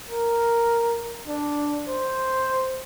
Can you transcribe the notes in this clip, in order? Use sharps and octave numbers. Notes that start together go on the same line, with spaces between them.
A#4
D4
C5